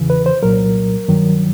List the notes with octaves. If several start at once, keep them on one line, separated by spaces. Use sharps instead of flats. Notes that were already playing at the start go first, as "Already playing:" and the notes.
Already playing: E2 C#3 E3
B4
C5
C2 A#2 F#3 A#4
G2 D#3 F#3